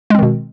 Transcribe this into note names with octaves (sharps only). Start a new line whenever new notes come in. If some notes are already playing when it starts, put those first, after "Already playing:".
B2 D#3 G#3 C4